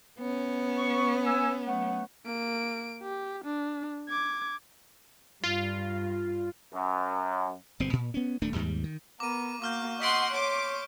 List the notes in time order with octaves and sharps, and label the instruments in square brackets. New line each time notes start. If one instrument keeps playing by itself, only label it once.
[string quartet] B3 C#4
[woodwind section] C#6
G#5 E6
F#3 A3 F#5
[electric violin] A#3 D7
G4
D4
D6 G#6
[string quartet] G2 [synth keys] F4
[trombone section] F#2
[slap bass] G1 B2 C4
A#2
B3 C#4
D#1 A3 D4
D#2 G#2 G3
D#3
[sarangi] B3 [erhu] A#4 [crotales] D6 D#7
[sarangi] A#3 [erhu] F#4 [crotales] D6 F6 G6
[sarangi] D#5 [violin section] F#5 C6 [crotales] C#6 B6 D7
[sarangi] C#5 [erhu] C6 [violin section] D6